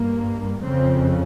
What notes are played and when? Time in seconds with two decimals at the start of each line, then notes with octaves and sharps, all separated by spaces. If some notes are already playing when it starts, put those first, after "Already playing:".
Already playing: G2 A#3
0.62 F2 C#3 C4